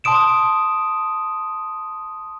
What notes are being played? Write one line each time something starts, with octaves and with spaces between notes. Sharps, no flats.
A5 C6 D#6 D7 E7